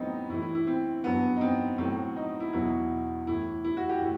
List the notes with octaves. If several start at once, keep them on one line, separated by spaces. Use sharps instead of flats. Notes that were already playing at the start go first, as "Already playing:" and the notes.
Already playing: A2 F#3 B3 C4 D#4
A2 E3 E4
E4
E4
C4
G2 F#3 B3
D#4
C4
A2 F#3 C4
D#4
E4
E2 B2 F#3 E4
A2 E3 E4
E4
F#4
G4
A2